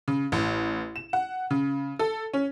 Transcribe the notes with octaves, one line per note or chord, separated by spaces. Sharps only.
C#3
A1
E7
F#5
C#3
A4
C#4